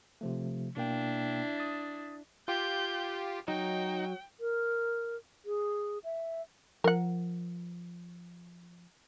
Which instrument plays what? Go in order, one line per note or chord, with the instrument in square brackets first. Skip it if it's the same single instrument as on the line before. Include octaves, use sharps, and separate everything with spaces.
[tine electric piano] C3 F3 A3
[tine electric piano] B2 A#3 G5 [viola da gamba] D4 E4
[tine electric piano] D#6 A6
[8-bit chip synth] F4 G4 [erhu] G6
[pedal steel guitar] F#3 [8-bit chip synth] D#4 [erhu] G5
[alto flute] A#4
G#4
E5
[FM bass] F3 [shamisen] A#4 F#5